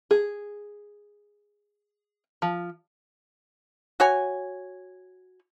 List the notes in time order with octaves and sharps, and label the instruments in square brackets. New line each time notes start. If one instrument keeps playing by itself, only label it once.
[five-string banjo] G#4
F3
[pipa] F#4 C#5 G#5